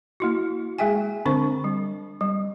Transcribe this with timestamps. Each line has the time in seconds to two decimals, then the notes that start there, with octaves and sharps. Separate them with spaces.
0.20 A#3 E4 F#4
0.79 G#3 G#4 E5 G5 G#5
1.25 D3 C4 D4 C5 C#6
1.64 G3
2.21 G3